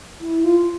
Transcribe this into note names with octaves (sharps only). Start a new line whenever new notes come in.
E4
F4